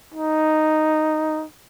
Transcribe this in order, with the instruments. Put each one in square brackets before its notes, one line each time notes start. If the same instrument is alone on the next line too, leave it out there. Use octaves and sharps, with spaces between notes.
[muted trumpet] D#4